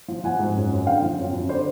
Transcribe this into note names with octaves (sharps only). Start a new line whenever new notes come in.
F3
F3 F#5 G#5
G#2
F#2
F#2
D3 F5 G5
F3
F#2
F#2
D3 C5 D5